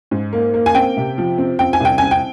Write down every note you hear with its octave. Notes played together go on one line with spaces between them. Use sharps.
G#2
A#3
A#3
G#5
C4 G5
C3
F3
C4
C4 G5
G#5
C2 G5
C4 G#5
G5